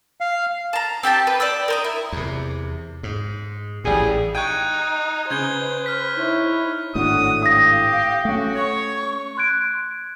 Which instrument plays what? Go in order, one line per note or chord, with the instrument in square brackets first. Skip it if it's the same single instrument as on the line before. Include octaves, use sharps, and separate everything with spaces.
[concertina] F5
[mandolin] A5 A#5
C4 G4 G5 A5
B4
D5 G5 E6
A#4 C5 D#5
E4
[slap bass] E2 C3
G#2
[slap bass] A1 A2 [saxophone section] G3 G#4
[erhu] D#4 [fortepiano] G5 C#6 [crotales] F#6 G#6 D#7
[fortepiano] C#3 [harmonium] B4 [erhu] C5 [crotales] G6 G#6 G7
[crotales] F6 B6
[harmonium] D#4 E4 C#5
[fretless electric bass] G#1 A2 D4 [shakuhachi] F#4 [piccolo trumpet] D#6
[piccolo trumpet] G4 [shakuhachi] F5 [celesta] D#6 A#6
[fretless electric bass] A3 C#4 [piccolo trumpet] F#4
[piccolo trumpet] C#5 [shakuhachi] C#6
[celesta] C6 F#6 G#6 D7